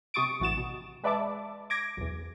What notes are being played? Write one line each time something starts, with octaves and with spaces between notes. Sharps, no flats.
C3 G4 C#6 D#6 A6 D7
A1 E3 F#4 A6 E7
B2
G#3 B4 D5 E5 A5 D6
D6 G#6 A#6 D7
B1 E2